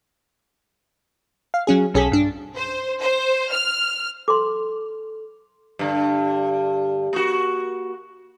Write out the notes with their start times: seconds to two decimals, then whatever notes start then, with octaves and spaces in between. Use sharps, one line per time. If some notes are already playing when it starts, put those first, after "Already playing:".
1.54 F5
1.67 F#3 C#4 G#4
1.94 B1 C#4 G#4 A4 B6
2.12 G2 D4
2.56 C5
3.00 C5
3.51 F6
4.28 A4 C6 D6
5.79 G2 D3
7.13 A#3 F#4